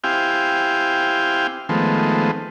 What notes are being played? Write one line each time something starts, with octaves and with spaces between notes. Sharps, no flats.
C4 E4 G4 F5 G5 G#5
D#3 F3 G#3 A3 B3 C4